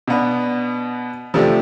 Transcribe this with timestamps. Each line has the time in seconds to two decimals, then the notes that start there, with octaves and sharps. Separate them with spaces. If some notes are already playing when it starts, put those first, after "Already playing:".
0.07 B2 B3 D4
1.34 C3 F3 A3 D4 G4